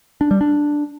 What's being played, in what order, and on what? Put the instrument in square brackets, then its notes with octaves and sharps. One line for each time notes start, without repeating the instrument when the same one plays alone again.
[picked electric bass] D4
G3
D4